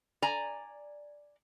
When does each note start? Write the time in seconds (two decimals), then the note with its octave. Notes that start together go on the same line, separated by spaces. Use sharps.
0.22 D5 G#5 A#5